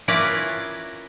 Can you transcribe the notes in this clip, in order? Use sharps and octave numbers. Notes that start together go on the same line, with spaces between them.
C#4 E4 F4 A#4 B4 D5